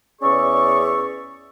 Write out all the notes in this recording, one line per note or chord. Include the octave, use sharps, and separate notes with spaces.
E2 C#4 G#4 D5 E5 C#6